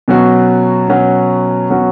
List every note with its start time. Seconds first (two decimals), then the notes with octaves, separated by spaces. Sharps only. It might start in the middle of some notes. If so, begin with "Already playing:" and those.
0.08 B2 F#3 C#4 F#4
0.88 B2 F#3 C#4 F#4
1.70 B2 F#3 C#4 F#4